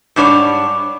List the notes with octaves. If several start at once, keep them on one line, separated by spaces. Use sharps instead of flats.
G#2 G3 D4 C#5 D5